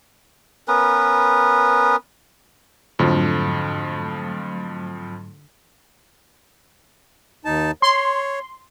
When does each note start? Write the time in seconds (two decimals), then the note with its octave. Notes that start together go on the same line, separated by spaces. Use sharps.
0.68 B3 C#4 A#4 B4
2.99 F2 G#2 D3 F3 F#3 A3
7.45 D#2 D#4 A5
7.82 C#5 C6